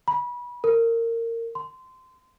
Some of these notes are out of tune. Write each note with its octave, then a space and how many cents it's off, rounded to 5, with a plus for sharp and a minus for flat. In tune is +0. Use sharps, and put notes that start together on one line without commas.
B5 -25
A#4 -25
C6 -20